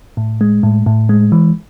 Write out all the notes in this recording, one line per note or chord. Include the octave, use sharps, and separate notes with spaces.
A2
G#3
A2
A2
G#3
E3